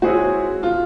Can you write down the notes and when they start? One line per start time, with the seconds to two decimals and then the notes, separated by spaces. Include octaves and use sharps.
0.02 G#3 C4 E4 F#4 G#4 C#5
0.63 F4